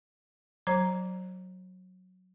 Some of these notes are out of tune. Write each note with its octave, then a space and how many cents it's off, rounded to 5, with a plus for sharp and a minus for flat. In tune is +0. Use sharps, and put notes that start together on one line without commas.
F#3 +0 C5 +40 A#5 +0